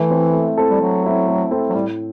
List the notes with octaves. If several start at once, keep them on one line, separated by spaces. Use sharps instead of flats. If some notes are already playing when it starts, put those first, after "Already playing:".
Already playing: E3 A3
C4 E4 A4
A3
C4 E4 A4
G3
F#3 A3
C4 E4 A4
A3
C4 E4 A4
F#3
A2 G3